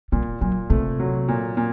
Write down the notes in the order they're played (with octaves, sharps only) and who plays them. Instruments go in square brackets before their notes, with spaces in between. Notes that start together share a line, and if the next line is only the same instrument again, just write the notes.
[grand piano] A#2 [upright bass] G3
[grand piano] A#2 [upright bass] F#3
[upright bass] C3 [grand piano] A3
[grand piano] F#3
A#2
A#2